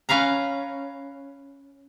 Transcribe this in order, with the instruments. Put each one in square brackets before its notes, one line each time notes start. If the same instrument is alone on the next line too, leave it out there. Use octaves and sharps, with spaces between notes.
[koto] C#4 B4 F5 A#5